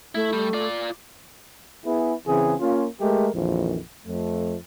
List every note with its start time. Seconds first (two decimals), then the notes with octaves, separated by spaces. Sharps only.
0.15 A3 E4
0.33 G3
0.53 F4 D5
1.86 B3 E4 G#4
2.27 C#3 E3 C4 G#4
2.59 A#3 C#4 F4
3.00 G#3 A3 G4 A#4
3.34 A#1 F2 D#3 E3
4.06 F2 A3